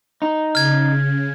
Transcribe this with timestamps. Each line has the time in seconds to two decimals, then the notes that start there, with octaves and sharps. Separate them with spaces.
0.22 D#4
0.55 C#3 F6 G#6